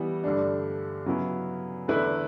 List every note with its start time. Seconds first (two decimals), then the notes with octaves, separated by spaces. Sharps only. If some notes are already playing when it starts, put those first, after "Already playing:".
Already playing: E3 G3 B3
0.24 G2 D3 A3 D4
1.06 C#3 F#3 B3 E4
1.88 E2 D3 A3 E4 B4